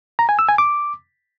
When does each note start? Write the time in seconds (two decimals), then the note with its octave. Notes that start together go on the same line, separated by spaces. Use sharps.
0.19 A#5
0.29 G#5
0.39 E6
0.49 G#5
0.58 D6